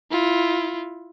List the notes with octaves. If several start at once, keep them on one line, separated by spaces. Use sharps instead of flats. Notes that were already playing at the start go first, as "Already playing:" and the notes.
E4 F4